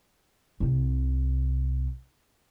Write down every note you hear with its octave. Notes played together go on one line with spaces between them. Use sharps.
C2 C3